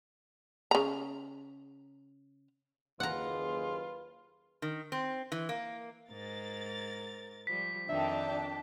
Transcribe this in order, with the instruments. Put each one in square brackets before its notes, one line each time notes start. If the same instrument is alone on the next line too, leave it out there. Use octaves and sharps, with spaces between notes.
[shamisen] C#3 A#5
[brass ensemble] F#1 D#2 G#4 [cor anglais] F4 [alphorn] B4 [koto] F#5 A#5
[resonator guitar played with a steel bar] D#3
C4
E3
A#3
[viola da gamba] G#2 A#4 [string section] A6
[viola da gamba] F3 G3 [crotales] B6
[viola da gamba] F2 D#3 [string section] D4 G5 A5 [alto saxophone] E5